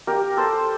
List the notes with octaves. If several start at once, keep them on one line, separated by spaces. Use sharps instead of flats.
G4 A#4
A4 C5